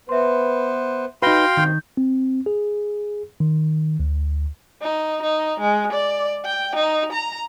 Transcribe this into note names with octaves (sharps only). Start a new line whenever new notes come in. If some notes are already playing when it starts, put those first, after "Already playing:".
B3 B4 C5 E5 C6
D#4 F#4 B4 F5 G5 C6 A#6 G7
G2 B2 D#3 C4 G6
C4
G#4
D#3
D2
D#4
D#4
G#3
D5
G5
D#4
A#5